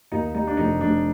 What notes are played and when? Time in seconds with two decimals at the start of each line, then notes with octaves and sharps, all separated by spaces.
0.12 D#2 D#4
0.34 G3 D#4
0.47 D4
0.57 F1 D#4
0.81 F1 D4